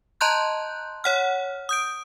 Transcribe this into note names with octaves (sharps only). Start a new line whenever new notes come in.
D#5 A5 A#5 C6 F#6 G6
C#5 F#5 F6
D#6 G6 D7